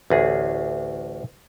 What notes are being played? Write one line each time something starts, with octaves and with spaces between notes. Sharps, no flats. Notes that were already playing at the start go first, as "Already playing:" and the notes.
A1 D2 G#4